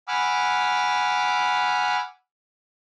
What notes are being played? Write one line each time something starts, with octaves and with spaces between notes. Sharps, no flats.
F#5 G#5 B5 D6 E6 F6